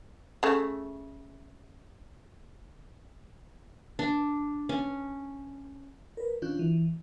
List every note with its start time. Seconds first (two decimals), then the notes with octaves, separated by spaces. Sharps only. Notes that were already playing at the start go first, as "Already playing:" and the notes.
0.43 C#3 A3
3.99 D4
4.69 C#4
6.17 A#4 B4
6.42 D#3 C#4 D4 F4 F#6 G6
6.59 E3